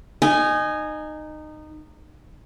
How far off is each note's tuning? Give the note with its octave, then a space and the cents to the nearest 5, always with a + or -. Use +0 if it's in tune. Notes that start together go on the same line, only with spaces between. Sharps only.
D#4 -20 G#5 +0